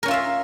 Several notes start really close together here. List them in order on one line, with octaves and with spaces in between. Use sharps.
A#4 C#4 F4 E5 F5